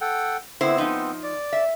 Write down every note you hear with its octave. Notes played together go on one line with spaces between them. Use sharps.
A4 F#5 G5
D3 B3 C4 E4 C5
F3 D#4
D5
E5